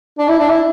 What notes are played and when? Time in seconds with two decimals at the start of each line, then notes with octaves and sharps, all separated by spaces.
0.19 D4
0.28 E4
0.40 D4
0.49 E4